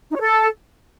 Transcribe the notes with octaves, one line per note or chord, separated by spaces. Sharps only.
D#4
C#5
A4